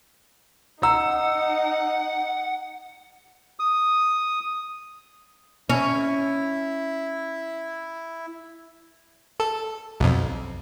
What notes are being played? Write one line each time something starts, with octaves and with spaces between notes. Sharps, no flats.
D#4 F#5 A#5 E6
D#6
C#4 E4
A4
B1 F2